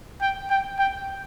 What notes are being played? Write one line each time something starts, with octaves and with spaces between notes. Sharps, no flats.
G5
G5
G5